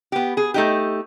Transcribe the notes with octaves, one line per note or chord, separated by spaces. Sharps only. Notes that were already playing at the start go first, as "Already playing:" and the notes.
B3 G4
G#4
A3 D#4 G4